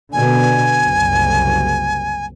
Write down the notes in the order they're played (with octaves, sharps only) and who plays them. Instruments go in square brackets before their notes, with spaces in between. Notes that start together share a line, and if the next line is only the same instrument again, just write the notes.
[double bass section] B2 D3 [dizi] G#5
[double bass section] F#1 C2